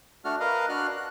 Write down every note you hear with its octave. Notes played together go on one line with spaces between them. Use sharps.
A3 D4 F#4 F6
A#4 B4 D#5 F5
D4 F#4 F6 F#6
F#6